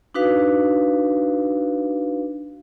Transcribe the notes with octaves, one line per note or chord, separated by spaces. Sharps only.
D4 D#4 F#4 B4 F5